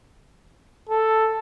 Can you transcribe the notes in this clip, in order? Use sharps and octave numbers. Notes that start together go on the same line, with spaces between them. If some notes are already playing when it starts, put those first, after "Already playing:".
A4